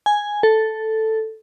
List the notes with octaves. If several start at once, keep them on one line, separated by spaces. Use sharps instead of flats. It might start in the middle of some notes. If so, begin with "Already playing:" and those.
G#5
A4